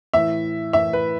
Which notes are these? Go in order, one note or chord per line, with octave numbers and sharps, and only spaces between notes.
A2 E3 E5
A2 E3 E5
B4